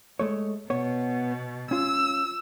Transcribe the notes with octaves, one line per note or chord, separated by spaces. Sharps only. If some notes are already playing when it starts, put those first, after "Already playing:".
G#3 A3 C#5
B2 B3 C#5
C#4 F4 E6